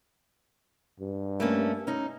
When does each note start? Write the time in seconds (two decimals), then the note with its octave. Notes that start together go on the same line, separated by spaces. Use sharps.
1.00 G2
1.40 A3 A#3 C#4
1.87 C#4 D#4